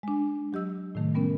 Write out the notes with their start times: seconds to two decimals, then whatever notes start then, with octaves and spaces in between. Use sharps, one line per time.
0.03 G#3 D4
0.53 F#3 G4 D#5 E6
0.95 A2 C3 D#3 A3
1.15 G3 B3 C#4 A#4